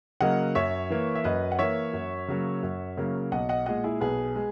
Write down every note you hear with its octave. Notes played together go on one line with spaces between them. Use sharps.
C#3 F#3 A#3 D#5 F#5
F#2 C#5 E5
E3 A#3
E5
F#2 B4 D#5
F#5
E3 A#3 C#5 E5
F#2
C#3 F#3 A#3
F#2
C#3 F#3 A#3
B1 D#5 F#5
D#5 F#5
A#2 G#3 D#5 F#5
E4 G#4
B1 G#4 B4
G#3